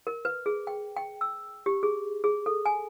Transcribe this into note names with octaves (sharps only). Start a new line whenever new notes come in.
A#4
B4
G#4
G5
G5
E6
G4
G#4
G#4
A4
G#5